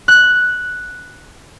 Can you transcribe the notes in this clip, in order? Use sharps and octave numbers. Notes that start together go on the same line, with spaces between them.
F#6